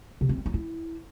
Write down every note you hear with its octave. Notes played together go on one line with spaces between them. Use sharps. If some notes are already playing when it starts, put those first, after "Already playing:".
C3
C4
G3
D#4
E4